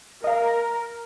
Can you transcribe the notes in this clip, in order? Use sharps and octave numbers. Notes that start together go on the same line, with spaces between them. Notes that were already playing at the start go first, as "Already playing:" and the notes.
A#4 D#5 F5